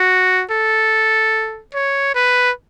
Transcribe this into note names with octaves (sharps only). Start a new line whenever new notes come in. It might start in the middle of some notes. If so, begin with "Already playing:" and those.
Already playing: F#4
A4
C#5
B4